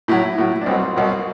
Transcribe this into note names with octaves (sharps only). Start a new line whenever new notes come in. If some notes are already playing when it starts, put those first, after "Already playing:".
A2 F#3 E4
A2 F#3
D4
C2 B2 F#3 C4
C2 B2 F#3